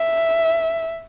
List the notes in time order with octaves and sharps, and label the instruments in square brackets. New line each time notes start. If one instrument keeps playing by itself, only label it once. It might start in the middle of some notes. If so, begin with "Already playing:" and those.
Already playing: [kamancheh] E5